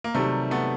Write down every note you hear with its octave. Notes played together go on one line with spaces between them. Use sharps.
A#3
C3 D#3 F#3 G3 A3
A3 B3